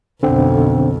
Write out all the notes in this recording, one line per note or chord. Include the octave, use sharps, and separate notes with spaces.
B1 F2 D3 C4